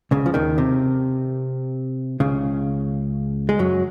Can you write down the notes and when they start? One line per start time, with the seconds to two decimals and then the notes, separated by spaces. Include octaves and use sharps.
0.11 C#2 C#3
0.26 F3
0.34 D#2 D#3
0.58 C3
2.20 C#2 C#3
3.49 G#3
3.59 F#2 F#3